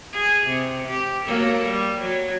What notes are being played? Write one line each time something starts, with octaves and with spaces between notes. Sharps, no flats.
G#4
C3
G4
F#3 A#3 A4
G3
F#3